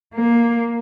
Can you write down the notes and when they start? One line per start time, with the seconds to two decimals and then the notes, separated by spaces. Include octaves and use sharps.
0.14 A#3